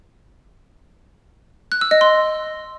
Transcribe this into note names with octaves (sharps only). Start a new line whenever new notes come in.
F#6
E6
D#5
C6